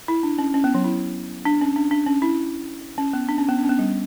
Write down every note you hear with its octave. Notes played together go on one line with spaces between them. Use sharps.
E4
D4
C#4
C#4
B3
F#3
E4
D4
C#4
D4
D4
C#4
E4
C#4
B3
D4
C#4
B3
D4
C#4
B3
G3